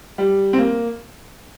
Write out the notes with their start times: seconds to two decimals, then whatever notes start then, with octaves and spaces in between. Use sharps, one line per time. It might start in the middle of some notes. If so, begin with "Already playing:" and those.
0.18 G3
0.53 C4
0.58 A#3